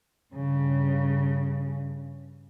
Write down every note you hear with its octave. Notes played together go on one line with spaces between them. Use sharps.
G2 C#3